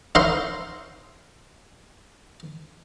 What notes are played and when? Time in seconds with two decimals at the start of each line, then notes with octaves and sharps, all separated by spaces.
0.15 D#4 E4 A#4 C#5 F5 C6